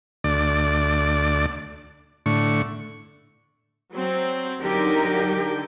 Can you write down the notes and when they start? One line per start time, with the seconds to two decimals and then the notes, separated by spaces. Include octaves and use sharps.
0.24 D2 D5
2.26 A2 D3 C#6
3.93 F#3 C4
4.61 D3 F#3 D#4 G4 A#4 G5